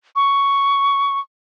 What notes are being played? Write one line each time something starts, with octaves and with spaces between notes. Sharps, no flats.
C#6